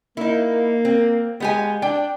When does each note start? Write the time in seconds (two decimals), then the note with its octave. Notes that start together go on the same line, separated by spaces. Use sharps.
0.17 A#3 D#4 E4
0.85 C4
1.40 G#3 B3 G4 G#5
1.82 D4 G5